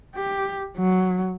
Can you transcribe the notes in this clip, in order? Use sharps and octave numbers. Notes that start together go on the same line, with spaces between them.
G4
F#3